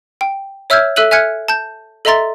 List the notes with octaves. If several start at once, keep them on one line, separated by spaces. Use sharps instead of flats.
G5
C#5 E5 E6 F6 G6 G#6
A4 E5 E6 F#6 D#7 F#7
E5 G#5 F6 F#6 G#6 C#7
A5 G6
A4 D#5 E5 A#5 C6 A6